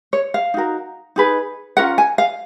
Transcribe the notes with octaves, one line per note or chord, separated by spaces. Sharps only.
C#5
F5
D#4 F#4 A#4
D#4 G#4 B4
C#4 F4 A#4 F#5
G#5
F5